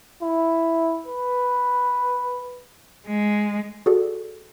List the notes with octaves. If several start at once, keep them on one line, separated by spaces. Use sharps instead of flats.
E4
B4
G#3
F#4 G#4 A4 D5